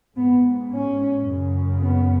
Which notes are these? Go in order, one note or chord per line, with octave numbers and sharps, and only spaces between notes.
G#2 B3
C#4
F#2 C#3
B3